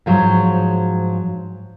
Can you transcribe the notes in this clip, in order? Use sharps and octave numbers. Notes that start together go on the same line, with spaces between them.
G#2 F3 F#3